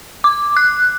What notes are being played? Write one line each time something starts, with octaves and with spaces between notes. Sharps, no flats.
D6
F#6